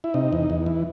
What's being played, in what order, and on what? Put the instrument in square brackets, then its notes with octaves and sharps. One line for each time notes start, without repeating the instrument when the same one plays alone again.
[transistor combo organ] E4
C3 D#4
E2
E2
E3